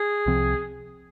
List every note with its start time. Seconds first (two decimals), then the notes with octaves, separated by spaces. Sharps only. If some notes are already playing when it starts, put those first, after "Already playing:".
Already playing: G#4
0.26 C2 C3 F3 C4